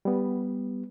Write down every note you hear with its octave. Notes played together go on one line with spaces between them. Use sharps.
G3 B3